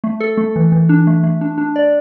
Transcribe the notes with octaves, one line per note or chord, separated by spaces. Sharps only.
A3
A4
A3
E3
E3
D4
A3
A3
D4
D4
D5